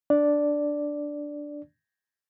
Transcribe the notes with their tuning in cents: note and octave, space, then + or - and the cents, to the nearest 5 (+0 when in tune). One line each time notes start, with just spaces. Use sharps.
D4 +0 D5 +0